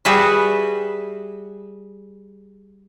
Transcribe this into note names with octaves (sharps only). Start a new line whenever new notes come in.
G3 F#4 G#4 B4 E5